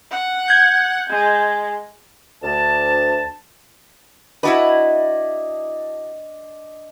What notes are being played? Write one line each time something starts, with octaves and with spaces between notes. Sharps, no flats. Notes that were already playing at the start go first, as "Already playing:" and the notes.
F#5
G6 G#6
G#3
D2 A5
D4 E4 F#4 B4 D#5 A5